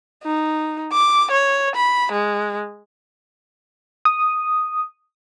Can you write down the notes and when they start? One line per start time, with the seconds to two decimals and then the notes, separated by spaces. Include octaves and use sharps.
0.24 D#4
0.93 D6
1.31 C#5
1.76 B5
2.12 G#3
4.05 D#6